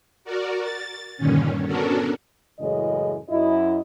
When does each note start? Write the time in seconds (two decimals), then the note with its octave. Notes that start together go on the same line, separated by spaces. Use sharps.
0.24 F#4 A#4 D5
0.62 A6
1.17 G2 A#2 D3 D#3 C#4
1.66 B3 C#4 D4 F#4 A4 A#4
2.60 F#2 A2 C#3 E3 G#3 D#5
3.29 F#2 E4 D#5